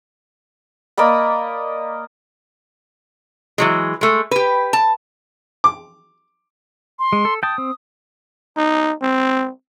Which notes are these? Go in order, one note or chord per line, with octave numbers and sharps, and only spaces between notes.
A#3 D5 D#5 B5
E3 F#3 G#3
G#3 A3
G4 B4
A5
D6
C6
G#3
A4
G5 A5 D#6
C4
D#4
C4